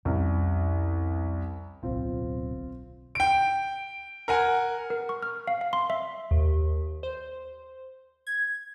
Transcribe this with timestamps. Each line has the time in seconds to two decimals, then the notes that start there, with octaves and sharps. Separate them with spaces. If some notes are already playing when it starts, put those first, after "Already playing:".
0.05 C2 F2 C#4
1.83 D1 B1 C4 F4
3.15 G5 D7
4.28 A#4 F#5 G#5
4.90 A#4
5.09 C#6
5.22 F6
5.48 F5
5.61 F5
5.73 C6
5.90 E5
6.31 D#2
7.03 C5
8.27 G#6